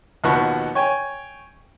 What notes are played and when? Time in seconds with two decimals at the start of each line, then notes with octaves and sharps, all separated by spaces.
0.24 D#2 B2 F3 F#5 C#6
0.75 C#5 G5 G#5